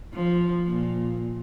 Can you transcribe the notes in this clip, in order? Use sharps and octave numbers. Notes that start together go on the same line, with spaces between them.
F3
A#2